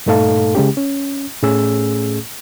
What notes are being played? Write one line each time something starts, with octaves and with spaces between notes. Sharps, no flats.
G2 A#2 A3 D#4 A4 F5
C#3 G#3 C#4 G4
C#4
A2 A3 C#4 G#4 E6